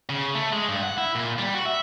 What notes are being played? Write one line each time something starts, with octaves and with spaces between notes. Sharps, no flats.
C#3
A3
G#3
G2
F#5
E4
A#2
G3
F#4
E5